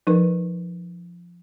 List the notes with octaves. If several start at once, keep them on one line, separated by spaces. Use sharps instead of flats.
F3 D#4 A#4 B4